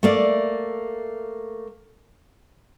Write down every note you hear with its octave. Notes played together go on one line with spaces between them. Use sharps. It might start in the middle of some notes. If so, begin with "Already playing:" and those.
A3 A#3 D5